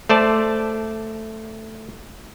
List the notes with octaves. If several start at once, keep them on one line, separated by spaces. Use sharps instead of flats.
A3 C5 D5 A5